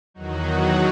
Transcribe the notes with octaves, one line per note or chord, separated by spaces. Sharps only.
E2 D#3 F#3 D#4 F#4